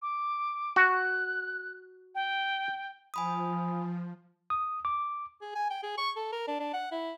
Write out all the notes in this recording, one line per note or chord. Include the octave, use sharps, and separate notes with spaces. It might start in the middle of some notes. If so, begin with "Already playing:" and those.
D6
F#4 F#6
G5
F3 G#5 B5 D#6
D#6
D6
G#4
G#5
G5
G#4
C#6
A4
A#4
D4
D4
F#5
E4